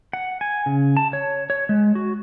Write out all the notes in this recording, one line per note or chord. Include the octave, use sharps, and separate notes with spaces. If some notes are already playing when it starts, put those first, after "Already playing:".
F#5
G#5
C#3
A5
C#5
C#5
G#3
F#4